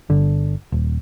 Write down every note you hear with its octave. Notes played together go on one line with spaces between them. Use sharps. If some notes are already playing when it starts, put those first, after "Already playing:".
G1 D3
D#1